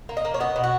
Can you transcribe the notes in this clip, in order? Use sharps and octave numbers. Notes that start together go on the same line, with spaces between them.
A#3
D#5
A#3
C#5
B3 D#5
B2
F#4